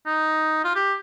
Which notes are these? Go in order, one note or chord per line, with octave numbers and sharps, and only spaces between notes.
D#4
F4
G4